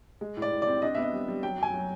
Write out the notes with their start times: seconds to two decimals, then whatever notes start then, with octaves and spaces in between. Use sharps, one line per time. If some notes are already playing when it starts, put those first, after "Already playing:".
0.21 G#3
0.37 A2
0.42 D5
0.52 A2
0.62 D5
0.67 C4
0.82 D4 D#5
0.95 E5
0.98 B3 D#5
1.13 G3
1.28 G3
1.43 F#3 G5
1.58 F#2 G#5
1.74 F#3